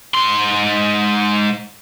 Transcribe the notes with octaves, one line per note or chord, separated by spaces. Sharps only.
G#2 C6